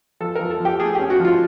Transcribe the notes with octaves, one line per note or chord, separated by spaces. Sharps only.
F3 A4
F3 A#4
A4
F3
G4
A3 G#4
C#4 G4
F#4
F3
F4